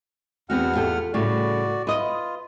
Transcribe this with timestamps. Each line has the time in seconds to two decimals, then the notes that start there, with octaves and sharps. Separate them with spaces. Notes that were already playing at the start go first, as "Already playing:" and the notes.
0.50 E2 B3 C4 F#4 F#5 F6
0.76 F4 G4 A4
1.14 A2 C#3 G3 F#4 D5
1.87 F4 B4 D#5